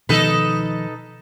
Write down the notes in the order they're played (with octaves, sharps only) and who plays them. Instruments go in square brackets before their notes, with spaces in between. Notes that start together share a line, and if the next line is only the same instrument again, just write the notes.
[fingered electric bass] B2 D#3 F3 [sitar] D#4 A4 B4